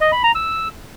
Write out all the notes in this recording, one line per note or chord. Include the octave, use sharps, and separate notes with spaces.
D#5
B5
A#5
E6